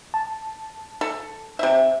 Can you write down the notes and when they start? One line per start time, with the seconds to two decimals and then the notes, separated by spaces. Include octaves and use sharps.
0.14 A5
1.01 A4
1.59 C3 E5